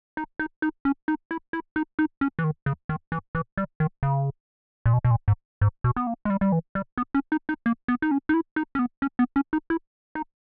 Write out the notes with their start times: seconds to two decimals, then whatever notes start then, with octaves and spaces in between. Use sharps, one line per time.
0.17 D#4
0.39 D#4
0.62 D#4
0.85 C#4
1.08 D#4
1.31 E4
1.53 E4
1.76 D#4
1.99 D#4
2.21 C#4
2.39 E3
2.44 D#3
2.66 C#3
2.89 D#3
3.12 E3
3.35 E3
3.57 G3
3.80 D#3
4.03 C#3
4.86 A#2
4.93 B2
5.04 B2
5.11 A#2
5.28 G#2
5.61 G#2
5.84 B2
5.96 B3
6.07 A#3
6.25 G#3
6.30 G3
6.41 G3
6.52 E3
6.75 G3
6.97 B3
7.14 C#4
7.32 D#4
7.49 D#4
7.66 A#3
7.88 B3
8.02 D#4
8.11 C#4
8.29 D#4
8.34 E4
8.56 D#4
8.75 C#4
8.79 B3
9.02 C#4
9.19 B3
9.36 C#4
9.53 D#4
9.70 E4
10.15 D#4